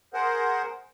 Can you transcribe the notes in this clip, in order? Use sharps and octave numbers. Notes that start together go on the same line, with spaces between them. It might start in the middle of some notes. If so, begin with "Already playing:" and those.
G#4 A#4 C5 F#5